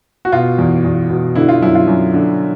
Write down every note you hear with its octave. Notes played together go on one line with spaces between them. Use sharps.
F#4
B2 F4
E2
E2
B2
D3 E4
F4
F#2 E4
F4
F#2
D3